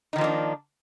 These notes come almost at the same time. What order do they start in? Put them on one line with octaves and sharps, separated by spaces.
D#4 D#3 F3 A#3 D4